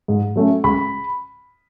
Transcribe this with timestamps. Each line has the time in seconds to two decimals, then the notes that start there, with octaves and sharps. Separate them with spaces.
0.08 G#2
0.36 F#3 A3 C#4
0.64 C#2 B5